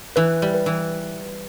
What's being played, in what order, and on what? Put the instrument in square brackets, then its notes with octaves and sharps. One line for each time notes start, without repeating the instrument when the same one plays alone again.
[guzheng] E3 [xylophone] B4
[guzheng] G3
[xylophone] B4
[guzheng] E3